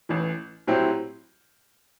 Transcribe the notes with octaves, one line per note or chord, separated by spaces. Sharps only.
A1 A2 E3
A2 F#3 C4 E4 G4